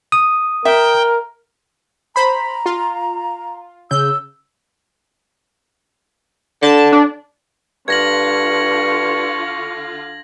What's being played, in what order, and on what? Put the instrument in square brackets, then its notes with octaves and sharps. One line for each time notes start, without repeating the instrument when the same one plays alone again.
[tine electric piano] D#6
[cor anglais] A#4 [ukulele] E5 [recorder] G5
[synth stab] C5 B5 [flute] A#5
[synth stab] F4
[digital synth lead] C#3 [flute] E6 [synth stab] G6
[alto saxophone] D3 [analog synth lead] A5
[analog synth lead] D4
[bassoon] G2 [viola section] D3 F4 F5 [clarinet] C#6 [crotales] G#6 A#6 F#7